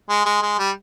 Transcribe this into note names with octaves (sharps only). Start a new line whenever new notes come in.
G#3
G#3
G#3
G3